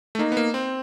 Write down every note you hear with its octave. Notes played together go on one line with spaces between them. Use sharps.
A3
A#3 D#4
B3
A#3
C4